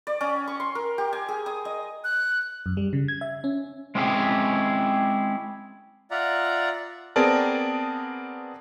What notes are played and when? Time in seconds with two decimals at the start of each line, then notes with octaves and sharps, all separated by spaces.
0.07 D5
0.21 C#4
0.47 C#6
0.60 C6
0.75 A#4
0.98 G4
1.13 G#5
1.28 G#4
1.46 D#6
1.65 D#5
2.04 F#6
2.66 F#2
2.77 G3
2.93 C#3
3.08 G#6
3.21 E5
3.44 C#4
3.95 G#3 C4 C#4 E4 G4 G#4
6.11 F4 D5 E5 F#5 A#5
7.16 B3 C4 G#4 A#4 D5 A5